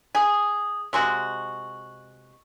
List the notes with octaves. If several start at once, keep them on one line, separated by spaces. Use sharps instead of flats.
G#4
C3 G#3 F#4